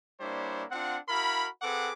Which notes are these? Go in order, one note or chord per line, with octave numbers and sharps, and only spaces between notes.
G3 A#3 D4 E4 C5 C#5
C4 D4 F4 F#5
E4 F#4 A#4 F5 B5
C4 G#4 A4 B4 F#5 D6